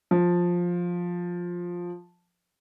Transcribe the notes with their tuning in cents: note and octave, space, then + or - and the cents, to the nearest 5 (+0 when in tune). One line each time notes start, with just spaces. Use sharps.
F3 +10